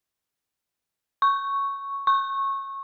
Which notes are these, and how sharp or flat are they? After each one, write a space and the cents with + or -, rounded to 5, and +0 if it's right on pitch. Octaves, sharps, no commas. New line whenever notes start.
C#6 +0
C#6 -20